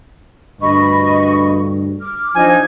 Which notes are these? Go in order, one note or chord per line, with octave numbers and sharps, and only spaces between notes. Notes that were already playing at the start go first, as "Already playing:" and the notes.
D2 G2 D#5 B5 C#6
D6 F6
F3 D4 D#4 G#5